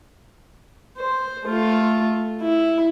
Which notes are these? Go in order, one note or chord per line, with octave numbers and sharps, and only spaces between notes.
C5
A3 F4
E4